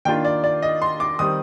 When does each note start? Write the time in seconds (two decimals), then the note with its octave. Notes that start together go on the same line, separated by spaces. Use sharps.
0.05 D#3 A#3 D4 F4 G5
0.25 D5
0.44 D5
0.62 D#5
0.82 C6
1.00 D6
1.19 D#3 G3 C4 D#6